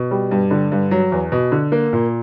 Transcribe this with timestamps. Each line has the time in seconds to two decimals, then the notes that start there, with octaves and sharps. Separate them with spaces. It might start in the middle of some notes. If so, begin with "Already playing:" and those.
Already playing: B2
0.11 G3
0.31 G2
0.51 D3
0.72 G2
0.91 F#3
1.12 E2
1.32 B2
1.52 D3
1.72 A#3
1.93 A#2